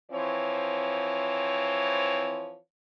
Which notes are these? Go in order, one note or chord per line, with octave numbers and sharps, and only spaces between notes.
E3 F3 C4 C#5